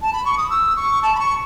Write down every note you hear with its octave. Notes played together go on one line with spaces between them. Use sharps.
A5
B5
C#6
D#6
E6
C#6
A5
B5
C#6